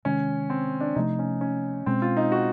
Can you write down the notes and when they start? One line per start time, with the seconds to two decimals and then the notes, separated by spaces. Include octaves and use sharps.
0.05 C3 D#3 G#3 C#4
0.50 C4
0.80 D4
0.95 C3 F3 A3 D#4
1.19 C#4
1.41 C#4
1.86 B2 G#3 C4 C#4
2.02 F4
2.17 D#4
2.32 F#4